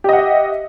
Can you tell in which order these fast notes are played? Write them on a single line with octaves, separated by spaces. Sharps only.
G4 D#5 F#5 E5